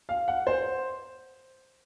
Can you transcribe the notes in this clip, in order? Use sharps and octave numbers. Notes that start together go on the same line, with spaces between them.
F5
F#5
C5